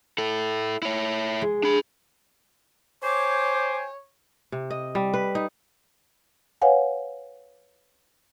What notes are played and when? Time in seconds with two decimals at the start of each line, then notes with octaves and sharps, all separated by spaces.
0.18 E4 A4
0.82 E4 C#5
1.41 G#3
1.63 D4 B5
3.03 C5 C#5 G5 G#5 D6
4.52 C3
4.70 D#5
4.95 G3
5.14 B4
5.35 D#4
6.62 B4 C#5 F5 F#5 G#5